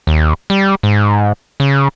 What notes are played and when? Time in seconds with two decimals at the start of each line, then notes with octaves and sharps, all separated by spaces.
0.07 D#2
0.50 G3
0.83 G#2
1.60 C#3